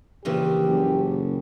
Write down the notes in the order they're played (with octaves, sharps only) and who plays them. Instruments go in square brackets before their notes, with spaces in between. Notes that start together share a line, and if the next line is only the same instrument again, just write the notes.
[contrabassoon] A#1 [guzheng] A#2 C#3 E3 [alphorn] G4
[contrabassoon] F#1